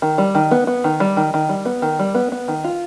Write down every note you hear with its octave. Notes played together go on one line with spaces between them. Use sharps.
D#3
G3
D#3
B3
B3
D#3
G3
D#3
D#3
G3
B3
D#3
G3
B3
B3
D#3
F4